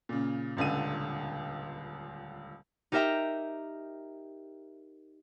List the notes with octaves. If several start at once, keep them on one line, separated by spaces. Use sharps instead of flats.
A#2 C#3
D#1 C#2 D3 D#7
D#4 G4 A#4 E5 G5 A#5